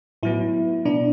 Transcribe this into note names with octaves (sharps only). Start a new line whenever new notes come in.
A2 F#3 B3 E4
B2 B3 D4